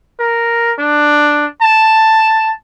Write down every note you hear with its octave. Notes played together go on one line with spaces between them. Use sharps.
A#4
D4
A5